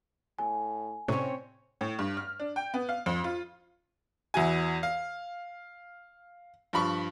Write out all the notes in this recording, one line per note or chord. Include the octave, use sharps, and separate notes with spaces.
A2 G#5
A2 C3 C4 C#4 C#5
A2
G2
F6
D4
G5
B3
F5
F2
F4
E2 E4 F#4 G#5
F5
G2 F3 B5 C#6